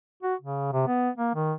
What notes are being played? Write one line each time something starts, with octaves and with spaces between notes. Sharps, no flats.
F#4
C#3
C3
B3
A#3
D#3